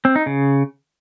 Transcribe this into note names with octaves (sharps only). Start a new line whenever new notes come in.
C4
D#4
C#3